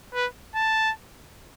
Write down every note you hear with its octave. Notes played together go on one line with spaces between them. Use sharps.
B4
A5